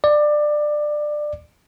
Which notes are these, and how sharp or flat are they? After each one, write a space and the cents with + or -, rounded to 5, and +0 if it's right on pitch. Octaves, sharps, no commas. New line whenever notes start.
D5 +20